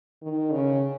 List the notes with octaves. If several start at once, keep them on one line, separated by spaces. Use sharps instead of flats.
D#3
C#3